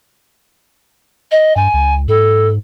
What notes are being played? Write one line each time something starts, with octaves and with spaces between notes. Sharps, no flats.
D#5
G2 G#5
C#2
G#2 A4